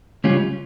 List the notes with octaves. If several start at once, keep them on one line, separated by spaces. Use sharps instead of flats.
C#2 C#3 G3 C#4 F4